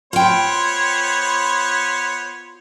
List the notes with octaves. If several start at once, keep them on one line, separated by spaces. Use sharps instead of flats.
B3 F4 C5 C#5 G5